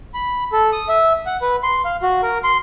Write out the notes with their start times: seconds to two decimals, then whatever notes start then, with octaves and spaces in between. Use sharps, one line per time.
0.14 B5
0.52 A4
0.72 D#6
0.88 E5
1.26 F#5
1.41 B4
1.63 C6
1.85 F5
2.02 F#4
2.23 A#4
2.44 C6